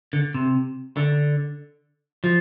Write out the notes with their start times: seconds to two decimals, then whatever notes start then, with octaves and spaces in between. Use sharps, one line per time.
0.13 D3
0.34 C3
0.97 D3
2.24 F3